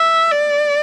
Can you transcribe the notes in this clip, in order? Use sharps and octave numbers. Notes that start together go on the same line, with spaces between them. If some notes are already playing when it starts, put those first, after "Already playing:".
Already playing: E5
D5